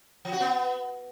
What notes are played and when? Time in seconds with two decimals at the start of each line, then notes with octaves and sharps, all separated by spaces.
0.25 F3
0.33 F#4
0.41 B3